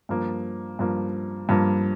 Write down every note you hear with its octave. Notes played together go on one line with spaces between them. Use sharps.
G2 F3 A#3
G2 F3 A#3
G2 F3 A#3